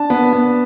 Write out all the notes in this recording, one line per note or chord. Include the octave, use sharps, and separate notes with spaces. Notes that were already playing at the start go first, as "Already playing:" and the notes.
Already playing: D4 A5
B3
B3